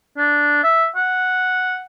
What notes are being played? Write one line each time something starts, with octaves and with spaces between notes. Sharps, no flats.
D4
E5
F#5